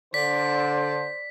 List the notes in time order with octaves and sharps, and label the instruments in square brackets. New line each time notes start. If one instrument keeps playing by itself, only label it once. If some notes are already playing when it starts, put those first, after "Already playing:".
[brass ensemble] D3 [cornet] C5 [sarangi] D5 [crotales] B6